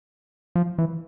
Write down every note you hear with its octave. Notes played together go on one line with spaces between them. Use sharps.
F3
E3